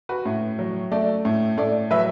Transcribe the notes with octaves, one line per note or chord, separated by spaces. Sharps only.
F#4 B4
A2
F#3
A3 A4 D5
A2
A2 A4 D5
F#3 B4 E5